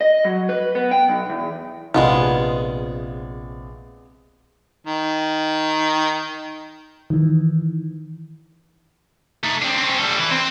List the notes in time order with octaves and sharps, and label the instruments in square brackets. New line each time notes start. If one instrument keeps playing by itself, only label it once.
[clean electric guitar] D#5
F#3
B4
B3
G5
B1
E2
[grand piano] A#1 C3 [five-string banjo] G#3 B3 F4
[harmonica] D#3
[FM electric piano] D#3 E3
[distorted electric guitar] A3 D#4
C4 D4
C4 C#4
G3 A4
E3
C4 C5